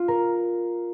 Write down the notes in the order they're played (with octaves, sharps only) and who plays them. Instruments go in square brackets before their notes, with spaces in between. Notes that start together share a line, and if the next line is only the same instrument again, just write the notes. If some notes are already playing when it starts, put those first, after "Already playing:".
Already playing: [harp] F4
A#4